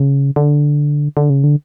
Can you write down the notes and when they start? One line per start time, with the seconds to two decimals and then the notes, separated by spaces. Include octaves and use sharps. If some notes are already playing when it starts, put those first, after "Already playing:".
Already playing: C#3
0.36 D3
1.17 D3
1.30 C#3
1.44 D3